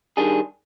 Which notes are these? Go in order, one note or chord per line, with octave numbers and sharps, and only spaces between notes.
D#3 G3 D4 G#4